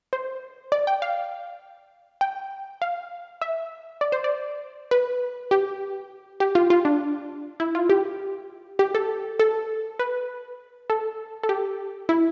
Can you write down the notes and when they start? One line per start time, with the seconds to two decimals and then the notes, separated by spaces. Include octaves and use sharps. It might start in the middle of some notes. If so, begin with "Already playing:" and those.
0.13 C5
0.72 D5
0.87 G5
1.02 F5
2.21 G5
2.82 F5
3.42 E5
4.01 D5
4.12 C5
4.24 D5
4.91 B4
5.51 G4
6.40 G4
6.55 F4
6.70 F4
6.85 D4
7.60 E4
7.75 F4
7.90 G4
8.79 G4
8.95 A4
9.40 A4
9.99 B4
10.90 A4
11.43 A4
11.49 G4
12.09 E4